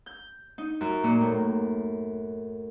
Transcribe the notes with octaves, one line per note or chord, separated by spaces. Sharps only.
G6
D#4
F#2
A#2
A2